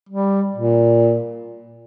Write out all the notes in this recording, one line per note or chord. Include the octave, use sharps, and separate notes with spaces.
G3
A#2